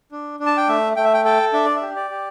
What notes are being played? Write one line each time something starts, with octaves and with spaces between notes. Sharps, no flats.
D4
D4
A5
G5
A3 E5
A3 G5
E5
G5
A4 G5
D4 E5
D5
E5
G4
D5
G4